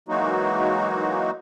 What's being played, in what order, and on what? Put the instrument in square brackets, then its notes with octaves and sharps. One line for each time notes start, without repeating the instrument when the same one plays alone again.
[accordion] E3 F#3 G#3 A#3 D#4 F#4